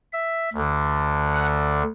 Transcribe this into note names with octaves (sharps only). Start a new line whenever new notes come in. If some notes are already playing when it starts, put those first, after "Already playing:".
E5
D2 D3
F#5